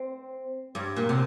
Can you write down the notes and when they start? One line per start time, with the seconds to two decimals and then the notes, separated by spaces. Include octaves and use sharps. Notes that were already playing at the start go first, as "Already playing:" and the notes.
Already playing: C4
0.75 G2
0.96 A#2
1.09 C3